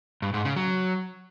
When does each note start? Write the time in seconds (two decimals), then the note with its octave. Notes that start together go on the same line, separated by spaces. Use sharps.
0.22 G2
0.34 G#2
0.45 C#3
0.56 F#3